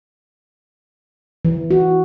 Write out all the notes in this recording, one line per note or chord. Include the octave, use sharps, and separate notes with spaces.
E3
F#4